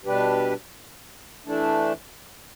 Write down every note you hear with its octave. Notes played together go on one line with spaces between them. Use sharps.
B2 G3 D4 G4 B4
E3 A3 D4